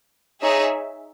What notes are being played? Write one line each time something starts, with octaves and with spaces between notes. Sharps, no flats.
D#4 G#4 C#5 E5